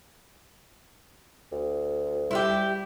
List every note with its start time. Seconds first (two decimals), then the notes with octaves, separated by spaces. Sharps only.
1.52 D2
2.31 G3 E4 F4 G4